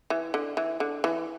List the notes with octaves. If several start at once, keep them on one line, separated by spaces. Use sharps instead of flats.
E3
D3
E3
D3
E3